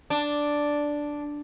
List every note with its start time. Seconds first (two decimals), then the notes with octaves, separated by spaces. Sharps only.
0.10 D4